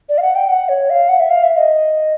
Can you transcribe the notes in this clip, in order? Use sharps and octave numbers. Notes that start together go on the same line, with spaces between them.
D5
F5
F#5
G5
F#5
C#5
F5
F#5
E5
F5
E5
D#5